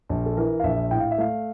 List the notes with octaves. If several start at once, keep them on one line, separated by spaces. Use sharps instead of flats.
A#1
A4
E3 A#4
F5
A#1 E5
A2 G5
F5
E5
A3 F5